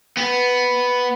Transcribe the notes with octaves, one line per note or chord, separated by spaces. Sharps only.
B3